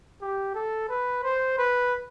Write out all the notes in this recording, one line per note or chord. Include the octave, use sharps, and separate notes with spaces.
G4
A4
B4
C5
B4